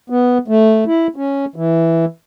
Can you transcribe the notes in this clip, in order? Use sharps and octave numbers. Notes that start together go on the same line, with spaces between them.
B3
A3
E4
C#4
E3